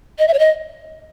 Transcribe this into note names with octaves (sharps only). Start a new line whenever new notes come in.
D#5
E5
C#5
D#5